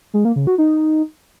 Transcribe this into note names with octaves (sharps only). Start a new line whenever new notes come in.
G#3
A#3
C#3
F#4
D#4